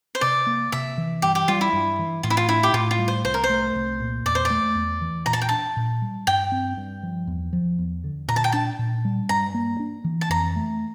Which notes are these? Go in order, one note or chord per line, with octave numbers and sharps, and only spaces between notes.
C5
C3 D5
A#3
C3 E5
E3
G2 G4
G4
G3 F4
E4
G2
E3
A2 F4
E4
F4
D4 E4
G4
A2 F4
F4
G3
C5
C2 C5
A#4
C5
A3
C2
A#2
E2 D5
C5
D5
A3
E2
E3
A#2 A#5
A5
G5
D4 A5
A#2
G3
G2 G5
C4
G2
F3
E2
F3
E2
D3
A#2 A#5
A5
G5
D4 A5
A#2
G3
G2 A#5
A#3
D4
E3
A5
F2 A#5
A3